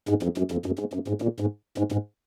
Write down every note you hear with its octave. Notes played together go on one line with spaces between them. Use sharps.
G#2
F2
F#2
F2
F#2
G#2
F#2
G#2
A#2
G#2
G#2
G#2